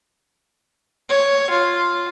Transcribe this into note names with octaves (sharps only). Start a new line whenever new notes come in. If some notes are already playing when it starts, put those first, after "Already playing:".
C#5
F4